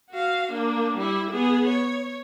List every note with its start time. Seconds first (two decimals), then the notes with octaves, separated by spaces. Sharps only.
0.10 F#4 F5
0.52 A#3 D4
0.97 G3 E4
1.31 B3 G#4
1.68 C#5